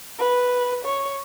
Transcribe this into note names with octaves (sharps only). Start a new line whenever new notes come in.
B4
C#5